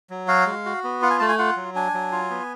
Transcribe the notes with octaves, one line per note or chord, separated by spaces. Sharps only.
F#3
F#4 F5
G#3
F#4
B3
F4 F#5
G#5
A3 A5
G#5
F4 F#5
F#3
D4 G#5
F#3
F4
B3